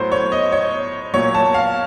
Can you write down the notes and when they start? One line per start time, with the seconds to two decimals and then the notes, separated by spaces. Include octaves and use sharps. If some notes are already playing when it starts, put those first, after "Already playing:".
Already playing: A2 F#3 C5
0.12 C#5
0.32 D#5
0.52 C#5
1.14 A#2 F#3 C#5
1.35 A5
1.54 F5